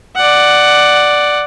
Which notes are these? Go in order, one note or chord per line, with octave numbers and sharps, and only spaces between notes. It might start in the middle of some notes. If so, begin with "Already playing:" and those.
D5 F#5